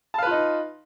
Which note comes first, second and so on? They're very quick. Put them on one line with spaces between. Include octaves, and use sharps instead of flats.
A5 F5 B4 F4 D#4